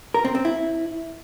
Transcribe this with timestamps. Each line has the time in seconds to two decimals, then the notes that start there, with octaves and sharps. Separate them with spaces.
0.14 A#4
0.25 C4
0.35 C4
0.45 E4